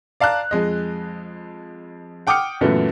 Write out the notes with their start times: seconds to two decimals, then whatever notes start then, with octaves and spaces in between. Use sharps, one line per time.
0.20 D5 F5 A5 A#5 F#6
0.51 F2 G#3 D#5
2.27 F#5 G5 D6 D#6 F6 C#7
2.61 F#2 A#2 E3 A3 B3